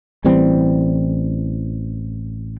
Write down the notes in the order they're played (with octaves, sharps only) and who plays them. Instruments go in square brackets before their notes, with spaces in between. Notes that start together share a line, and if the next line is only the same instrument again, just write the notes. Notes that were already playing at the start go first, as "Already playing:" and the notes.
[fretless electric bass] A1 E3 G3 C4